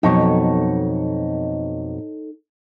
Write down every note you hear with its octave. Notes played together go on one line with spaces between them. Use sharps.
F2 B2 F#3 D#4 A4 C#5